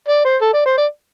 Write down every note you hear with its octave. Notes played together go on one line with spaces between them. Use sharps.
D5
C5
A4
D5
C5
D5